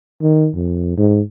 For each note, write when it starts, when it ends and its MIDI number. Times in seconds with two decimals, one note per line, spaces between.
0.22 0.48 51
0.54 0.94 41
0.97 1.21 44